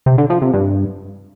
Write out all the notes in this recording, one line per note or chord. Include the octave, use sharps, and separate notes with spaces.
C3
D3
F3
C3
G2